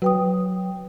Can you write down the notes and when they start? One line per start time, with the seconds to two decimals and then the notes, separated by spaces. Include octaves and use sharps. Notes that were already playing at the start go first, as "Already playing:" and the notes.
0.02 F#3 B4 G5 D#6